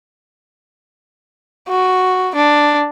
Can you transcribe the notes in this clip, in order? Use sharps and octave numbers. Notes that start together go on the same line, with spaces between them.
F#4
D4